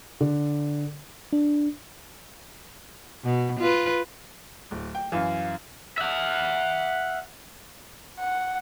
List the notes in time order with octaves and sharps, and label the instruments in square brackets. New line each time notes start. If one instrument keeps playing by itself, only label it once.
[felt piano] D3
[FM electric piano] D4
[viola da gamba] B2
F4 B4
[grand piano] D1
G5
[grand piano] F#2 E3 [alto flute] F5
[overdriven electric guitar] E5 F#5
[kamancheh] F#5